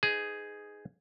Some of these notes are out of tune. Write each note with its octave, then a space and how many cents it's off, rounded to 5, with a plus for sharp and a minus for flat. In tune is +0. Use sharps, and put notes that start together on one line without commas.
D#4 +0 G#4 +0 B4 +40